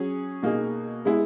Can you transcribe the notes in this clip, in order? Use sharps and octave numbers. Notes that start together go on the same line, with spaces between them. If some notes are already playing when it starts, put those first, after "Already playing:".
Already playing: F#3 C#4 G#4
B2 A#3 D#4 G#4
G#3 B3 E4 G#4